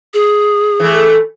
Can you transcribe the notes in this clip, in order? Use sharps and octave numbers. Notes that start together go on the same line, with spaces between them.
G#4
E3 A3